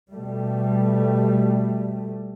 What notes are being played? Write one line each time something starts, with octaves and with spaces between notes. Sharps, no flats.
B2 G3 A3